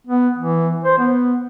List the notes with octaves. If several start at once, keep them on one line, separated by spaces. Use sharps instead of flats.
B3
E3
C5
B3